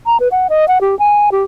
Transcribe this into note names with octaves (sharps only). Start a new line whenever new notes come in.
A#5
B4
F#5
D#5
F#5
G4
G#5
G4